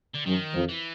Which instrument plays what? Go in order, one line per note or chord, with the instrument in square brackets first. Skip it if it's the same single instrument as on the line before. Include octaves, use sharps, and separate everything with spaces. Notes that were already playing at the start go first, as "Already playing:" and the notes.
[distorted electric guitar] D3
[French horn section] F#2 F#3 [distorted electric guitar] D#3
[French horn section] F2 F3
[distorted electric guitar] E3